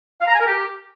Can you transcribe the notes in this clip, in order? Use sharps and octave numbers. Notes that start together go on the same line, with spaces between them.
F5
A#5
G#5
A#4
G4